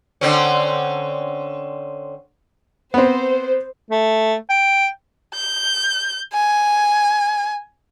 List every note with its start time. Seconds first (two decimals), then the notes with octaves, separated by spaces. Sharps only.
0.21 D3 C4 C#4
2.94 B3 C4 C5
3.91 A3
4.50 G5
5.35 G6
6.33 G#5